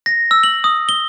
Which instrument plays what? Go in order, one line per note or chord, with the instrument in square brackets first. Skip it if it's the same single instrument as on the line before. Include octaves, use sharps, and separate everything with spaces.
[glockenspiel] A#6
E6
F#7
D#6
G7